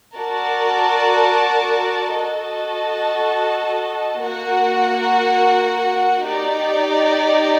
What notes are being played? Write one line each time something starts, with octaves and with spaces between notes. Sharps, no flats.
F#4 A#4 D5 A5
F#4 A4 D#5 A5
A#3 F#4 A#4 F#5
D#4 G4 D5